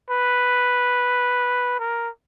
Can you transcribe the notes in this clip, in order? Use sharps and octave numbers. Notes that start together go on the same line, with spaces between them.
B4
A#4